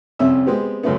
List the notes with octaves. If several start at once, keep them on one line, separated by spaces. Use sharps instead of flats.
C2 F2 C3 C#4 E5 E6
G#3 B3 C4 G4
C#2 F#2 A3 B3